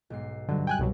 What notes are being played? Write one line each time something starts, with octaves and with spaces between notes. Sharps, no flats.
B1 G#2 C7
G2 D3 F#3
G5 G#5 F#6
C2 B2 F#3